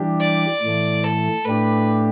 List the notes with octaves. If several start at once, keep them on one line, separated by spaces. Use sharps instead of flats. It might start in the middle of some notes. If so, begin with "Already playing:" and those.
Already playing: E3 G3 D4 G4
D5
A2 E3 A3
A4
A2 A3 D4 G4 B4